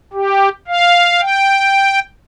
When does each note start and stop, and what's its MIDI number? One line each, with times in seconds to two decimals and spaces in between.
0.13 0.49 67
0.68 1.21 77
1.21 1.99 79